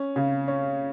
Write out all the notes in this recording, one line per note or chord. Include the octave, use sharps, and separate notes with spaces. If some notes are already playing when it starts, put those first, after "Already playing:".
Already playing: C#4
C#3
C#4